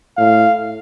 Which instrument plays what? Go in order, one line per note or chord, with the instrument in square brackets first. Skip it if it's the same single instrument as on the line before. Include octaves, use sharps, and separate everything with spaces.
[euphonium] A2 [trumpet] F5